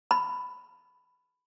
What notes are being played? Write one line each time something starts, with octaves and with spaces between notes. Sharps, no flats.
B5